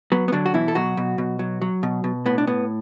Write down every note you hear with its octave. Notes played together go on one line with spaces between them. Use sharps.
F#3 B3
B3
D3 F#3 D4
F#4
B2 E3 E4
A4
B2 F#3 F#4
B2
B2
F#3
F#3
B2
B2
A2 B3
D4
A2 B3